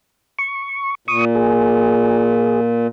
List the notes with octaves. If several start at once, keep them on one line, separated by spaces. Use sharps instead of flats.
C#6
A#2 C#6 D#6
G#4